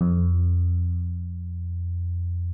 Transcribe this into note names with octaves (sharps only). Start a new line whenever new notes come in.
F2